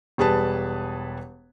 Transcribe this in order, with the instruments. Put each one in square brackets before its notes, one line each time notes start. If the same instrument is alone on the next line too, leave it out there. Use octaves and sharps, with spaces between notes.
[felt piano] E1 G3 G#4 B4 A5